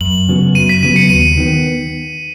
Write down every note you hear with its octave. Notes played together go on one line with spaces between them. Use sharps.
F#2 F#7
C#3 F#3 B3
F#2 D#7
B6
C#3 F#3 B3 D#7
C#7
D#2 D#7
D#3 B3